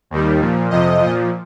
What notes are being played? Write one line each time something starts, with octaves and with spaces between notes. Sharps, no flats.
D#2 D#3 G3
A#2 F3
F2 C3 F3 D#5
A#2 F3